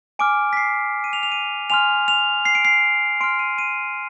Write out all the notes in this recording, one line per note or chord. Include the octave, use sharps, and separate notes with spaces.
G#5 D6 F6 D7
B6
C7
D#7
F7
F7
D#7
G#5 C6 F6 F7
F7
C7
D7
C7
C6 F6 D7
D#7
D#7